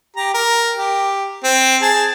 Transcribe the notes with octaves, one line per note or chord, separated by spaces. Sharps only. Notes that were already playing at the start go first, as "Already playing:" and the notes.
G4 A#5
A#4
G4
C4
G#4 A5